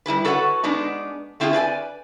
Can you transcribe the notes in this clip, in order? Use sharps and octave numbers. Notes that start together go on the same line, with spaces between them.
G3 E4 G#4 B4
F#4 A4 B4 C#5 E5 F#5
G#3 B3 D4 D#4
A3 C4 E4 F4 G4 G#4
B4 D5 G5 G#5